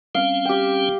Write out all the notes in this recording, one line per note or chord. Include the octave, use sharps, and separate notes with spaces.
G3 C4 C#4 F5
G4 G5